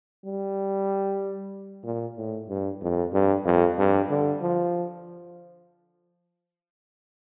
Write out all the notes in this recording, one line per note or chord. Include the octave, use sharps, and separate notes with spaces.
G3
A#2
A2
G2
F2
G2
F2
G2
D3
F3